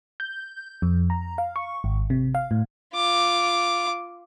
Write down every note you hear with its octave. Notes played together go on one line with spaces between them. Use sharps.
G6
F2
A#5
F5
C#6
G#1
C3
F5
A2
F4 D6